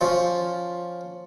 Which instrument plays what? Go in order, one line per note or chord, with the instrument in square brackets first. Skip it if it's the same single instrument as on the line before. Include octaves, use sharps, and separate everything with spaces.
[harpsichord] F3 C#4 F4